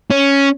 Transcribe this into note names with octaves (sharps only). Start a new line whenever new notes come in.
C#4